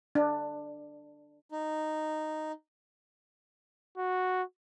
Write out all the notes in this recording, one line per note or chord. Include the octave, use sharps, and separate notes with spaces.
D4
D#4
F#4